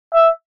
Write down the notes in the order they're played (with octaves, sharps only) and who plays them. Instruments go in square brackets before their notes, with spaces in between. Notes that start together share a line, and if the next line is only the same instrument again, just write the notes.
[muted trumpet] E5